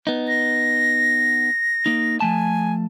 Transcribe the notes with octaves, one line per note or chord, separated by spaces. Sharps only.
B3 D#4
A#6
A#3 D#4
F3 A3 G#5 A5